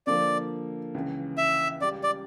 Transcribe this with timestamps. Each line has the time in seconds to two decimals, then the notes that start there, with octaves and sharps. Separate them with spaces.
0.07 D3 F3 A#3 D5
0.95 C#2 C#3 E3
1.38 E5
1.81 C#2 C#3 G3 D5
2.03 D5